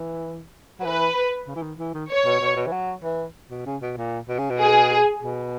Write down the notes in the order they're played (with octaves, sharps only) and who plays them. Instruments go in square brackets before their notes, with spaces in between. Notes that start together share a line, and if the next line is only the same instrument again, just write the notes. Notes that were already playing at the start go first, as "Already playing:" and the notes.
Already playing: [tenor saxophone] E3
F#3
[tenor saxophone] E3 [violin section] B4
[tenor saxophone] C#3
E3
D#3
E3
D#3
[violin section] C#5
[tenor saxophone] B2
B2
B2
E3
F#3
E3
B2
C#3
B2
A#2
B2
C#3
B2
[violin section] G#4
[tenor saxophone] B2